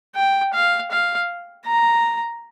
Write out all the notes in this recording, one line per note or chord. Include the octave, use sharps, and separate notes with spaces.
G5
F5
F5
A#5